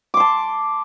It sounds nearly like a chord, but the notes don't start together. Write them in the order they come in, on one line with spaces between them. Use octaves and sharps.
D6 C6 A5